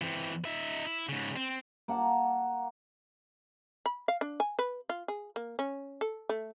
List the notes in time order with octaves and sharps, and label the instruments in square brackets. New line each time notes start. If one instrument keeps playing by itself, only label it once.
[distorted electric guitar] E3 C4
D#4 E5
E4
G#2 C#3
C4
[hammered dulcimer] A#3 F#5 A5
[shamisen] B5
F5
D4
G#5
B4
F4
G#4
A#3
C#4
A4
A3